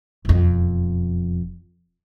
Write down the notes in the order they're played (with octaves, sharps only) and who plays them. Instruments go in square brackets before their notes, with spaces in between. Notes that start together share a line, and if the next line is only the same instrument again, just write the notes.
[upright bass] E1 F2